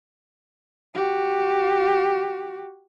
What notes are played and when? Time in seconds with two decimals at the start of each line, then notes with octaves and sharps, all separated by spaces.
0.95 F#4 G4